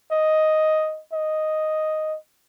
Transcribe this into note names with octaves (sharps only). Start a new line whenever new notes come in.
D#5
D#5